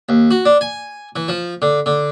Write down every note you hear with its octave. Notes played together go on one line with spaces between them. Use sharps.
D#2
F#4
D4
G#5
E3
F3
D3
D3